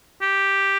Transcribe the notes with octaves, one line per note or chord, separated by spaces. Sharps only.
G4